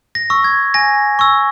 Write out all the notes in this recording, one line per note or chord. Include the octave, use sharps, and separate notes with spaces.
A#6
C#6 E6
G#6
G#5 A#6
C#6 E6